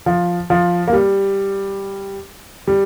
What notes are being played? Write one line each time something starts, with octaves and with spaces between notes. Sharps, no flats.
F3
F3
A#3
G3
G3